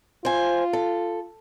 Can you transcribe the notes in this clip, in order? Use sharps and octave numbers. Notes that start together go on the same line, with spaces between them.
F4 C5 G#5
A4